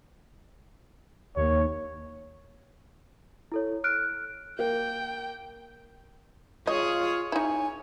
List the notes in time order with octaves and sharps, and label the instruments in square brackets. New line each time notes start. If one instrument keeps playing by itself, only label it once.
[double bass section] D#2 [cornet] C#5
[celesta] E4 A4 C#5
F6 F#6 D7
[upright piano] A#3 [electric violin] G5
[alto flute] F4 [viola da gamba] G#4 C#5 [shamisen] D#5
[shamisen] D#4 E4 [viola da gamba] C#5 [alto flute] G#5